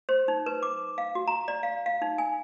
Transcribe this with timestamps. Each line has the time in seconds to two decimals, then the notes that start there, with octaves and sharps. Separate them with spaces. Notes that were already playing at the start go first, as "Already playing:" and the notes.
0.09 C5
0.28 D#4
0.46 B4
0.63 D6
0.98 F5
1.15 F#4
1.27 A#5
1.48 D5
1.63 F5
1.86 F5
2.02 D#4
2.18 G#5